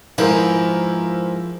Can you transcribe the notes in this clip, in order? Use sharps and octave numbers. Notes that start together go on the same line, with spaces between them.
G#2 F3 E4 A#4 B4